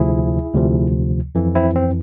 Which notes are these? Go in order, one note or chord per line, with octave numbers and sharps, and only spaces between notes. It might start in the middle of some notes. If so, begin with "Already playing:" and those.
Already playing: D2 C3 F3 E4 G#4
D2 C3 F3
F2 E3
C4 E4
C4